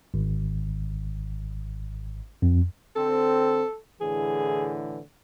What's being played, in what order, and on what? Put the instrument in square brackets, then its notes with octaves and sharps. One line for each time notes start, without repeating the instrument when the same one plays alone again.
[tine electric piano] G#1
F2
[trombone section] D3 C4 [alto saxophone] A4
[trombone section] A2 D3 E3 [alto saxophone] G#4